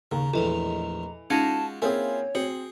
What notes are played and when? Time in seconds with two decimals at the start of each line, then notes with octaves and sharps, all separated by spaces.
0.11 D#2 C#3 A#5
0.33 A#1 E2 A2 E3 A4 D#5 F7
1.30 G#3 C#4 D#4 F4 F#4 F5 A5
1.82 A#3 C4 E4 F4 G#4 C#5 G#5
2.35 C4 F#4 G#4